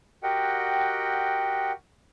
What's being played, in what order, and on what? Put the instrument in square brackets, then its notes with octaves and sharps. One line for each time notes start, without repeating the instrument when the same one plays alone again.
[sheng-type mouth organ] F#4 G4 A#4 D#5 F#5 G5